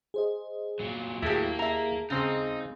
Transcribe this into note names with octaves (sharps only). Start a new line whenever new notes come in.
G#4 C5 D#5
A#2 F#3
D#2 A2 F#3 A#3 E4 G4 G#4 A5
E5 A#5
C#3 G#3 C4 D#4 A#5